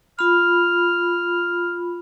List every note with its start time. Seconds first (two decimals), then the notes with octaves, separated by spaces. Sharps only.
0.19 F4 B5 F6